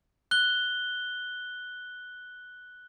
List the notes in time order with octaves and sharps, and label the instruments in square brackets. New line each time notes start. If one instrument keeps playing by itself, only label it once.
[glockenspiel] F#6 G7